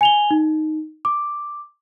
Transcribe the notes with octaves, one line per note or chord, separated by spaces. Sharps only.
G#5 F7 G7
D#4
D6